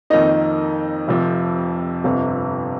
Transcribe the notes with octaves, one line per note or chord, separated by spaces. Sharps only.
F2 D#3 A#3 D#4 D#5
F1 F2 C3 F3
G1 F2 C3